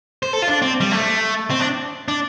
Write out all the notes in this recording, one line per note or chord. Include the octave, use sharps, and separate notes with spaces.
C5
A4
F4
D4
C4
G3
A3
C4
D4
D4